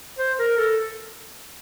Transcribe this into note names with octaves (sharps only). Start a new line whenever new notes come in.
C5
A#4
A4